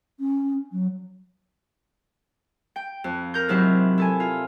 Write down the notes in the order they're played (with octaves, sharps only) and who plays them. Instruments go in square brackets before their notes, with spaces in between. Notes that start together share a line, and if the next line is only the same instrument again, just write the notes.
[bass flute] C#4
F#3
[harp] G5
F2
A#4 G6
G#2 C3 F#3 C4 E4
E4 A4 G#5
F4